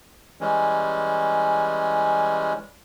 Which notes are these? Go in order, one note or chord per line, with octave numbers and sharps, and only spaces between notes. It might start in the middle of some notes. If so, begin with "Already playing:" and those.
E3 G3 G#3 C#4